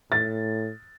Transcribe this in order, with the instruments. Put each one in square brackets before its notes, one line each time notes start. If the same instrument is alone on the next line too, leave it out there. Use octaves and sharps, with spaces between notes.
[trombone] A2 [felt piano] A6